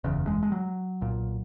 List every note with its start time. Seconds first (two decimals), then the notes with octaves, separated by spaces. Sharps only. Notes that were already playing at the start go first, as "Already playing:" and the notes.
0.04 F#1 E2 C#3
0.27 G#3
0.43 G#3
0.52 F#3
1.01 B1 A#2